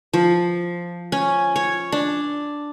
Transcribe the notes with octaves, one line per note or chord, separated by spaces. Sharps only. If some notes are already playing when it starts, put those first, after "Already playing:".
F3
C#4
C#5
D4